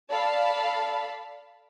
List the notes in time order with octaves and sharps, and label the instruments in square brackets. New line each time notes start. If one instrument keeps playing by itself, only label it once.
[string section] A4 D5 F5 A5 B5